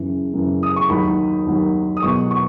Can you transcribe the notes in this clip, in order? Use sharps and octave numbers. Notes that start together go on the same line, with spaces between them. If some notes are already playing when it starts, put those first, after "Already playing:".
Already playing: F#2 C#3 E3
F#2 C#3 E3
D#6
C#6
D#2 D#3 F#3 B5
D#2 D#3 F#3
D#6
E2 B2 F#3 C#6
C#6